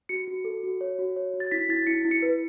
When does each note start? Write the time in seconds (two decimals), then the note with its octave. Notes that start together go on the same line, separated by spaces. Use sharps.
0.09 F#4 C#7
0.28 F#4
0.45 A4
0.63 F#4
0.81 C#5
0.99 F#4
1.16 C#5
1.34 F#4
1.40 A6
1.51 E4 B6
1.69 E4 A6
1.87 E4 C#7
2.05 E4
2.11 C#7
2.22 B4